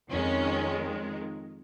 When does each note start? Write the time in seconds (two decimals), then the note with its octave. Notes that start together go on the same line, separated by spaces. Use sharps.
0.10 F2 D#3 G#3 C#4